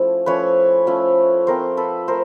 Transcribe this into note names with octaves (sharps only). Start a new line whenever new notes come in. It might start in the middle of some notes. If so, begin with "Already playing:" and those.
Already playing: F3 A3 C#4 E4
F3 A3 C#4 E4 B4 C#5
F3 A3 C#4 E4
A3 C4 F4 A#4 C5
A4 B4
A3 A#4 C5